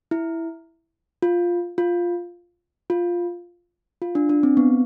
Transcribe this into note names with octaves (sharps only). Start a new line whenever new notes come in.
E4
F4
F4
F4
F4
D4
D4
C4
B3